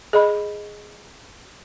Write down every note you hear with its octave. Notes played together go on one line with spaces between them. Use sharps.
G#4 D#5 B5